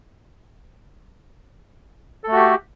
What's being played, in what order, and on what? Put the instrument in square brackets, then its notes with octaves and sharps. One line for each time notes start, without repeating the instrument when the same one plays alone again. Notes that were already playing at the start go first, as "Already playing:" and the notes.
[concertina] A4
A3
F#4
G4